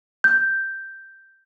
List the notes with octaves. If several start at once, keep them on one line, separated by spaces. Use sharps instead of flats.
G6